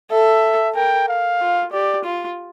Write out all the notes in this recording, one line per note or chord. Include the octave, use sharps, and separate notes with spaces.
A4 E5
A#4 G5
F5
F4
G4 D5
F4